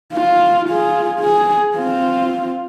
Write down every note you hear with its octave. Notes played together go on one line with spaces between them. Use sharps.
F4
F4 G#4
G#4
C4 F4